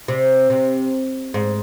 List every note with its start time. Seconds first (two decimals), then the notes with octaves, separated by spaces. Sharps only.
0.08 C3
0.50 C3
1.34 G#2